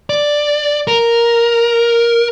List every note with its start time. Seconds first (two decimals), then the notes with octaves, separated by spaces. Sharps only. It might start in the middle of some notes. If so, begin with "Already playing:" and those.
0.10 D5
0.87 A#4